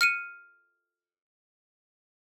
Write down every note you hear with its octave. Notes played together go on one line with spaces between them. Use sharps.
F6 C#7 D#7